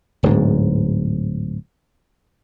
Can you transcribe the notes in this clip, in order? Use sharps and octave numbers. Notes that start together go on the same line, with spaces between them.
D1 G#2